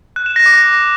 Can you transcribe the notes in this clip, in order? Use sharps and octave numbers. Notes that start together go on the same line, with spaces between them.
F#6
E7
A#6
D6
A#6